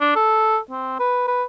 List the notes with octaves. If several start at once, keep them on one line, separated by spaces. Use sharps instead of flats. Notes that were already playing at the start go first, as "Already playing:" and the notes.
D4
A4
C4
B4
B4